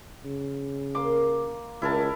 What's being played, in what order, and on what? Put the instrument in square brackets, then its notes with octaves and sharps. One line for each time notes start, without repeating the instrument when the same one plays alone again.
[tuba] C#3
[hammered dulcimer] A#3 C6 D6
[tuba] C#2 [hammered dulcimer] E4 A#4 A5